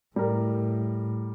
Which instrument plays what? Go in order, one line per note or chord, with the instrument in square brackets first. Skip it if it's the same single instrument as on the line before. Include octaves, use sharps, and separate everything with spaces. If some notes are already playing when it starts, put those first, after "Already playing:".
[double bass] A2 [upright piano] G3 A#4